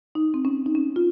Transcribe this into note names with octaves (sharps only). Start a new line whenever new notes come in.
D#4
C4
C#4
D#4
C#4
F4